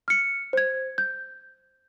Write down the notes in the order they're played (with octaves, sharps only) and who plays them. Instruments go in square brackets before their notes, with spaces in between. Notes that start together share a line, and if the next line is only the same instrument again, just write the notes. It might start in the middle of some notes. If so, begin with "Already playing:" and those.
[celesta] F6 C#7
C5 G#6
G6